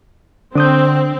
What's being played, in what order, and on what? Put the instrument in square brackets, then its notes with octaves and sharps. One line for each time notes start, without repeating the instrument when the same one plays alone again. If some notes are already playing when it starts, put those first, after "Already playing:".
[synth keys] D3 [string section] C4 [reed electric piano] D4 D#6 G6